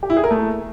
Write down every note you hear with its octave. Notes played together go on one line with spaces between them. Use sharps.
G4
E4
G#4
A#4
A3